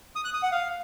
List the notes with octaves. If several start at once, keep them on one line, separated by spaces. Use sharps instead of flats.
D#6
F#6
D#6
F#5
F5